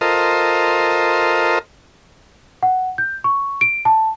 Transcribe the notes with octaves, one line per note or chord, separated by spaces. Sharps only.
F4 A4 A#4 C5 D#5
F#5
G6
C#6
D7
A5